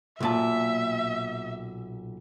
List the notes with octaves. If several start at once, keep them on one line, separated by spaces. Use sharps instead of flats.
B1 A#2 E5 A5